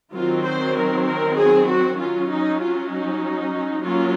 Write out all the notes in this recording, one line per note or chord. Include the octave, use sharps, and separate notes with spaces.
D#3 F#3 C4 F4
C5
A#4
A#4
G#4
F#4
F#3 C#4 F4
D#4
F4
D#4
F#3 A#3 C#4 F4